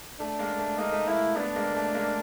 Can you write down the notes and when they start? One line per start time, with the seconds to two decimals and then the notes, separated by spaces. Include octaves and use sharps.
0.20 A3 D4
0.39 G#3 A#3
0.59 A3
0.78 G#3 A#3 D#4
0.92 A3
1.07 G#3 A#3 E4
1.36 A3 B3 D4
1.56 G#3 A#3
1.75 A3
1.95 G#3 A#3